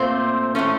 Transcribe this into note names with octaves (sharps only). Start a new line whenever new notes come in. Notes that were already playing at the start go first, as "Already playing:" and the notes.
Already playing: A#2 A3 C4 C5
A2 A3 C#4